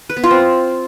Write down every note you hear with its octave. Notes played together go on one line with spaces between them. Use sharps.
B4
B3
F4
C4